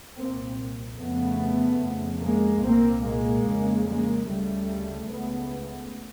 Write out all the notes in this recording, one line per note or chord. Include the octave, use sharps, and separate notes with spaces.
C2 A#2 A#3 C4
F2 C#3 A3 B3
F2 C#3
G#3 A#3
C2 A#2 A#3 C4
G#3 A#3
F2 C#3
G#3 A#3
D2 C#3 G3 A3
C#2 C#3 A3 B3